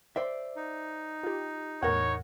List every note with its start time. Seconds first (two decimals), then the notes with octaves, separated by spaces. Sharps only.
0.16 C5 D5 E5
0.56 D#4
1.23 F4 G4
1.83 E2 A2 A#4 C#5 F#5